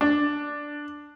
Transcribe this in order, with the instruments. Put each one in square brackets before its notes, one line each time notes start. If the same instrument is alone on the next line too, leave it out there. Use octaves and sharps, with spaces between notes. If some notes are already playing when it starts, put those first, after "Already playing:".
[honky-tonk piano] D4